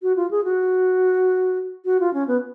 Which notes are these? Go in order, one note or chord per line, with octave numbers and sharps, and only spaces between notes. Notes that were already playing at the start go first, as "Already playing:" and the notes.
F#4
F4
G#4
F#4
F#4
F4
C#4
B3